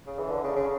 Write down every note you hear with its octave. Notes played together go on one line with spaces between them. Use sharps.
C#3
E3
D3
C#3
C#3